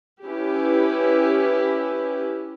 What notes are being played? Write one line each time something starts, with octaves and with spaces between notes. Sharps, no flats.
C#4 E4 G4 B4